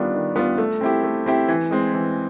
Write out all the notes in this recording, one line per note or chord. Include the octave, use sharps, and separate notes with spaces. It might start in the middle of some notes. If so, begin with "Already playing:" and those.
Already playing: D#3 G3 B3 D4 F4
D#3
G3 B3 D4 F4
A3
C4 E4 G4
A3
C4 E4 G4
E3
G#3 C4
E3